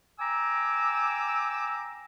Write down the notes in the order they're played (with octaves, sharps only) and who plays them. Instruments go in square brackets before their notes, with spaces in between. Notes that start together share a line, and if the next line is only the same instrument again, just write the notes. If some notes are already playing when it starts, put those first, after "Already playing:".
[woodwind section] G5 G#5 A#5 D6 E6